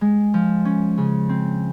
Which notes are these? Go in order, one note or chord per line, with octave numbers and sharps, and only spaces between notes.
G#3
F3
C#4
C#3
C4